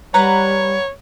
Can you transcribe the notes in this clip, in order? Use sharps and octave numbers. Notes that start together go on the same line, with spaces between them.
G3 B4 C#5 F#5 A#5